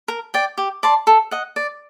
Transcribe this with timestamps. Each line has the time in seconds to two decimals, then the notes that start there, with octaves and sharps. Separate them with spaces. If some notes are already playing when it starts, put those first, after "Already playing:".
0.08 A#4
0.34 D5 G5
0.58 G4
0.83 D5 A5 C6
1.07 A4
1.31 D#5 F#5
1.56 D5